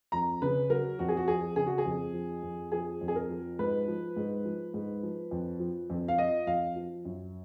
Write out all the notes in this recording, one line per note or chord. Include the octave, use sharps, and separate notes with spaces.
F2 A#5
C#3 B4
F#3 A#4
F2 F#4
G#4
F#4
F2 G#4
C#3 G#4
F#4
G#4
F2
F3
F2
F3 G#4
F2
G#4
A#4
F3
G#2 B4
F3
G#2
F3
G#2
F3
F2
F3
F2
F5
F3 D#5
F2 F5
F3
F#2